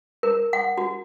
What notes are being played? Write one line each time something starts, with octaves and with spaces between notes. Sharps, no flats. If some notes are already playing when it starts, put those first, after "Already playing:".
A#4
F#5
F#4